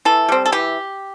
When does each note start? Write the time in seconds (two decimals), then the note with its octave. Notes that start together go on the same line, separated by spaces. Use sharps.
0.05 E3 A4
0.29 G3 C4
0.46 A4
0.52 E3 G4